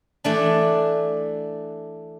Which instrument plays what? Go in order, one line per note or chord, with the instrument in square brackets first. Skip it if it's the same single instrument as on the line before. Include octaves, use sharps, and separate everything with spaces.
[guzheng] E3 A3 D4